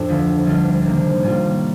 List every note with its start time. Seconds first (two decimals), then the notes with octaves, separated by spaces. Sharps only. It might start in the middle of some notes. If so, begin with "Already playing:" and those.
Already playing: F2 A2 D4 A4
0.09 D2 D3 F3 A3
0.45 D2 D3 G3 D4 F4
0.85 C3 D#3 A#3 D4
1.22 A2 G3 A#3 F4